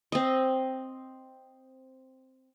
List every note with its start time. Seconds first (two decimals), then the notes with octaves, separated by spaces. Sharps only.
0.12 C4 D#5